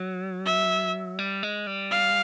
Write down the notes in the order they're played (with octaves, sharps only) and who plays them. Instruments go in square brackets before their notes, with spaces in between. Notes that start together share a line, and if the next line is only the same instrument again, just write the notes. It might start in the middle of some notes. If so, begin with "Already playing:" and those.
Already playing: [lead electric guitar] F#3
[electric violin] E5
[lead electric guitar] G3
G#3
G3
[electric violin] F5